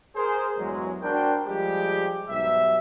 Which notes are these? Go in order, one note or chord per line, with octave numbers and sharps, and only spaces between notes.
G#4 A#4 C5
E2 G2 F#3 G#3
D4 F#4 A#4 C5 G5
F3 G3 G#3 G4
B1 G#2 G3 E5